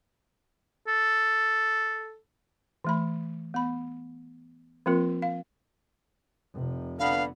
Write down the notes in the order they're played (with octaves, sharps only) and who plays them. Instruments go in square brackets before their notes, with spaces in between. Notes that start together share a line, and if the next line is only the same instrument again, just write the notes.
[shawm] A4
[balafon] E3 A3 B5
B3 B5
F3 A#3 C4 F4 A#4
F5
[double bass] F1 C3
[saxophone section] D3 B3 [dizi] F5